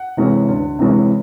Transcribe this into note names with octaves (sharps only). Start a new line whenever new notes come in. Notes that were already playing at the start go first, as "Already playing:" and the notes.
Already playing: F#5
C3 E3 G#3 C#4
D2
C3 E3 G#3 C#4